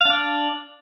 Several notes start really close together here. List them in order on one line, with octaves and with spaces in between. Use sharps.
F5 D4 D5